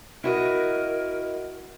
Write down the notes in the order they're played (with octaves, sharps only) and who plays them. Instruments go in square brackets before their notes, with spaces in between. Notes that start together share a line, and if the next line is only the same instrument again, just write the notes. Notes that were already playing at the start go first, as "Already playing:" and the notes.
[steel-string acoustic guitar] E4 F#4 D#5 [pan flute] A#4